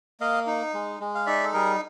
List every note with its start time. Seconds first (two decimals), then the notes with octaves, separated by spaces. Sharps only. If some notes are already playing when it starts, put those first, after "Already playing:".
0.20 A#3 D#5 F5
0.47 D#4
0.74 G#3
1.00 G#3
1.15 F5
1.26 D#4 D5 E5
1.44 A4
1.54 G3 G#4 A#4